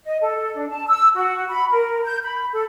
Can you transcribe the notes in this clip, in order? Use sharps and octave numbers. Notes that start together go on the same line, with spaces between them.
D#5
A4
D4
A5
E6
F#4
B5
A#4
G6
B5
A4